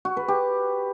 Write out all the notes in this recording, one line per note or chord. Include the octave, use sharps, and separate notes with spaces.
F#4
B4
G4